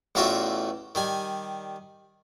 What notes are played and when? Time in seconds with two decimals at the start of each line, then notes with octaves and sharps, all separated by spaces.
0.15 A1 E2 F4 F#4 E5 G5
0.95 D#3 G3 G#5